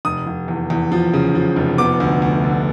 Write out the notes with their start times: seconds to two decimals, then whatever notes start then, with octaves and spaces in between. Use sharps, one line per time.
0.05 F1 D#6
0.27 F1
0.48 E2
0.70 E2
0.92 F3
1.13 C#3
1.35 F3
1.56 F1
1.78 B3 D6
2.00 D2
2.22 D2
2.44 D3